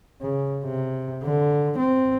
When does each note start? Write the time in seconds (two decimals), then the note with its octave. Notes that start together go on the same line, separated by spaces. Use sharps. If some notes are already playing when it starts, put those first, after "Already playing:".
0.22 C#3
0.64 C3
1.23 D3
1.78 C4